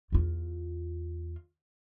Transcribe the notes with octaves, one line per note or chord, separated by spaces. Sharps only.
E2 F4